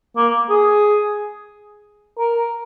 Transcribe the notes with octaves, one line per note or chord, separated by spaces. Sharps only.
A#3
G#4
A#4